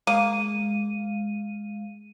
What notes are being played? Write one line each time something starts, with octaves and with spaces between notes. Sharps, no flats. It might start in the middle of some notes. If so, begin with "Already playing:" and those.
G#3 A#3 F5 D#7